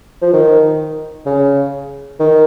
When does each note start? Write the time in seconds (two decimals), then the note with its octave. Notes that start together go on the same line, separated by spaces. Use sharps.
0.22 F3
0.33 D#3
1.26 C#3
2.20 D#3